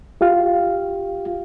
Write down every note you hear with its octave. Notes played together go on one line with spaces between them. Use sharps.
F4 G4 F5